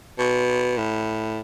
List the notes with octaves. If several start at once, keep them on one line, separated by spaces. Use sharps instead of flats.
B2
A2